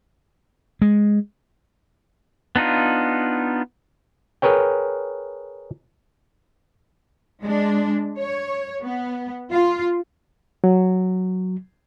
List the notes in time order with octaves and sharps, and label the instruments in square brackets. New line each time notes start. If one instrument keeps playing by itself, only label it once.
[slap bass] G#3
[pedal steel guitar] B3 D4 D#4 F4
[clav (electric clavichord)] G#4 A#4 B4 C#5 G5
[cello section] G#3 D4
C#5
B3
F4
[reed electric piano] F#3